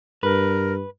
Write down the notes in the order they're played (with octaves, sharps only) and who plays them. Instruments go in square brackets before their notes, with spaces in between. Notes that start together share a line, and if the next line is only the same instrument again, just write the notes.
[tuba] G2 [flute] A#4 [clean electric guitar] B4